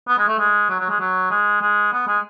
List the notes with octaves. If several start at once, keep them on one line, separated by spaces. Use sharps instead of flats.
B3
G#3
A3
G#3
F#3
F#3
G#3
F#3
G#3
G#3
B3
G#3